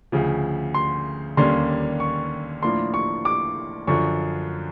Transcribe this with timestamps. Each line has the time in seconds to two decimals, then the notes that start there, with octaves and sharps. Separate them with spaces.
0.12 D2 C#3 F3
0.74 C6
1.37 D#2 D3 G3 A#3 C#4 C6
2.00 C#6
2.62 A2 F3 A#3 D4 C6
2.94 C#6
3.25 D6
3.87 F#2 D3 F3 C#6